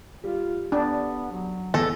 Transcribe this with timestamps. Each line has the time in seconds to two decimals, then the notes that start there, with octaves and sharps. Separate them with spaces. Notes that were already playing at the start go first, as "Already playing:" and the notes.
0.24 G3 F4
0.72 B3 D4
1.31 F#3
1.74 E2 A4 A#6